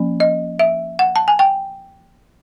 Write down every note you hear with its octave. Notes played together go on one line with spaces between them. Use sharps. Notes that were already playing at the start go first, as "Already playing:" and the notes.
Already playing: F3 A#3 C#4
D#5
E5
F#5
A5
G#5
G5